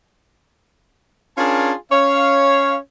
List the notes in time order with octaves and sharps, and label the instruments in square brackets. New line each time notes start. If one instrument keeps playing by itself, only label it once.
[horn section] C#4 D4 F4 G#4 A#4 A5
C#4 C#5 F5